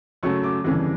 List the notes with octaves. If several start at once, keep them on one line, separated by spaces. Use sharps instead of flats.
F#2 C#3 F#3 A3 C#6
D6
G1 F2 C#3 E3 G3